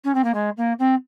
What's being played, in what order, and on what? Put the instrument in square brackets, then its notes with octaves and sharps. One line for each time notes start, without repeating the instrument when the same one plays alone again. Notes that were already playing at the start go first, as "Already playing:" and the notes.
[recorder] C#4
C4
A#3
G#3
A#3
C4